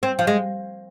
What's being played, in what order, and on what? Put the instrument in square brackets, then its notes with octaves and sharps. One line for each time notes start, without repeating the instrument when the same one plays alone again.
[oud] C4
F3
G#3